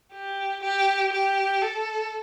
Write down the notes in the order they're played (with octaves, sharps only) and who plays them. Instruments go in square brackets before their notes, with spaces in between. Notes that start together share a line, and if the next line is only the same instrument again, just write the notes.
[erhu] G4
G4
G4
A4